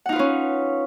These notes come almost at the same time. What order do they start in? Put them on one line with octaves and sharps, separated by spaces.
F#5 D#4 F4 B4 C#4